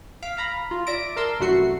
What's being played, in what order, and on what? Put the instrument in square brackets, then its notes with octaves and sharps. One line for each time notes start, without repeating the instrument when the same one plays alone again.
[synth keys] F5 B6 D7
F5 A#5 B5
F4
D5 E5 A#6 D7
A#4 A5 C6 E6
C2 F#2 A3 F#4 C7 C#7